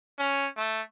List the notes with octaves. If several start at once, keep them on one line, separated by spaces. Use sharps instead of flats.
C#4
A3